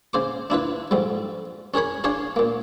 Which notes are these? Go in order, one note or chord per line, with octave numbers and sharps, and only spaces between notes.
C#3 C5 D6
D4 E4 F4 B4
F2 G#2 G3
C#4 G#4 A#4 C#5 B5
D4 G#4 C#5 F5 C6
A#2 A#3